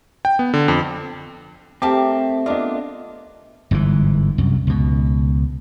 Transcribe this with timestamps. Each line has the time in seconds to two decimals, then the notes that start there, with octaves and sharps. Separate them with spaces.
0.25 G5
0.39 B3
0.54 D3
0.68 F2
1.82 A3 C4 G4 A#4 A5 D6
2.46 B3 D4 F4 A#4 D5 D#5 D6
3.71 G1 G#2 C#3 E3
4.38 C2 F#2
4.67 C#2 B2